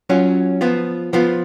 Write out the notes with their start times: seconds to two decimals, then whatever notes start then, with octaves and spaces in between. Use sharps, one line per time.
0.09 F#3 C#4 F4
0.61 F3 B3 F4
1.13 F3 B3 F4